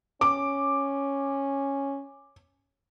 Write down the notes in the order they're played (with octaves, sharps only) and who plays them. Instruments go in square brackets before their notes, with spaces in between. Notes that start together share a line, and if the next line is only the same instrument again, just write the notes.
[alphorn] C#4 [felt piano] D6